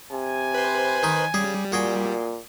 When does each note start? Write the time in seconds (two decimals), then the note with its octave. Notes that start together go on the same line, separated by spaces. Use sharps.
0.12 C3 G#5
0.54 B4 C5
1.03 D#3 D#4 B5
1.34 C#3 G3 G#4
1.72 A#2 F#4 G#4 G5